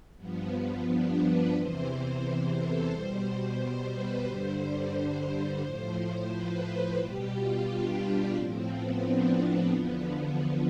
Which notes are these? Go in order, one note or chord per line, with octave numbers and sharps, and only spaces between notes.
G2 F3 B3
D4
B4
E2 C3 E3 C5
C5
A4
B2 G3 C5
C5
B4
G2 D3 G3 C5
A2 F3
B4
B4
B2 G3 G4
F4
D4
A2 F3 C4
B3
D4
D4
E2 D3 F3 B3